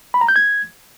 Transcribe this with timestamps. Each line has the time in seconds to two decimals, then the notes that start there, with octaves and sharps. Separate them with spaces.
0.14 B5
0.21 A#5
0.28 G6
0.36 G#6